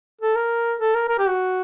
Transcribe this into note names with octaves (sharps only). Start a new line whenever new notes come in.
A4
A#4
A4
A#4
A#4
G4
F#4